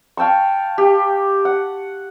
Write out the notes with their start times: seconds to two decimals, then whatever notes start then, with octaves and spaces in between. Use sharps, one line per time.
0.17 F5 G5 A5 C#6
0.78 G4
1.45 F#5